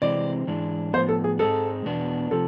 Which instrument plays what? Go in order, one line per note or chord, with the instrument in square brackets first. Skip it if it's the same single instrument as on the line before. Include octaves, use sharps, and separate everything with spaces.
[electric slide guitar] C3 E3 G#3 C4 [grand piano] D5
[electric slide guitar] G#2 E3 G#3 D4
[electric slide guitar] A2 F3 B3 [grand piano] C5
[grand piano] A4
G#4
[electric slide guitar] G#2 F3 G#3 C4 G#4 [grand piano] A4
[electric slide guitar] E2 B2 B3 D4
[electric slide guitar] C3 F3 [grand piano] A4